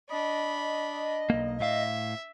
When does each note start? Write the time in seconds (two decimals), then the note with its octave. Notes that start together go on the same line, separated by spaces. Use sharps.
0.10 D4 D#5 B5
1.30 B1 A#3
1.60 A2 E5 F5